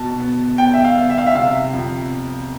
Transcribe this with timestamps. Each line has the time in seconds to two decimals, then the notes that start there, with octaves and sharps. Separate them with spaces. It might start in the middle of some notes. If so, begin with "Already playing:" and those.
Already playing: B2 A5
0.20 B3
0.58 B3 G5
0.74 E5
0.84 F5
0.97 B3
1.10 E5
1.18 F5
1.26 E5
1.35 C3 F5
1.74 F2